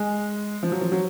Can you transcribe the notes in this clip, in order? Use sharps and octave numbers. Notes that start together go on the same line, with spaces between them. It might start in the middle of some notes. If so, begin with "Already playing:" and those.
Already playing: G#3
F3
F#3
F3
F#3